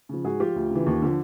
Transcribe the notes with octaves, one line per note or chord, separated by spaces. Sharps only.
C#3 F3
G#2 F#4 G#4
F3 F4 G4
D2
C#3 E3
D#2
D3 F3